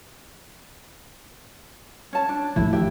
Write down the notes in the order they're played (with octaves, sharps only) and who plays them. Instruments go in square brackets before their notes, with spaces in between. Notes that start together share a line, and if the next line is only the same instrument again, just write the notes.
[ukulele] C#4 A5
D4
[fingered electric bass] G#1 F3 A3 [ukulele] E4
[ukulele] E4 G4 E5